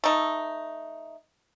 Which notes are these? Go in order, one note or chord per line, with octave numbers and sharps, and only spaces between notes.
A3 D#4